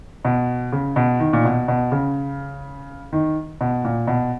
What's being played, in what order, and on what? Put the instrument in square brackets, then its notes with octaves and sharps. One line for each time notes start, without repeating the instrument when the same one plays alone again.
[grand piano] B2
C#3
B2
D#3
A#2
B2
B2
C#3
D#3
B2
A#2
B2